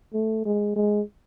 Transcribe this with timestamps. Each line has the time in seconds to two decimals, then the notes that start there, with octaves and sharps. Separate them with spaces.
0.14 A3
0.46 G#3
0.76 G#3